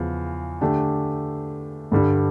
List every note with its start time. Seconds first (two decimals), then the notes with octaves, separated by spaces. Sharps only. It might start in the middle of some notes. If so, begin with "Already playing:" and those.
Already playing: E2 C#3 F3
0.61 D3 A3 D4 G4
1.92 G2 D3 G3 D4